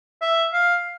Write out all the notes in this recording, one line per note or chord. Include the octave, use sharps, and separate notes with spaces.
E5
F5